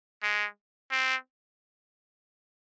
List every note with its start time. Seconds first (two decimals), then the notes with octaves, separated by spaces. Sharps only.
0.23 G#3
0.91 C4